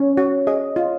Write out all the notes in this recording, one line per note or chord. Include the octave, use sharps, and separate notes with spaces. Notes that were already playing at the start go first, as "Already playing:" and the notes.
Already playing: C#4 C#5
F#4
G#4 D#5
F4